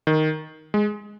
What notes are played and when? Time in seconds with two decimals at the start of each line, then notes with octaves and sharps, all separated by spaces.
0.07 D#3
0.74 G#3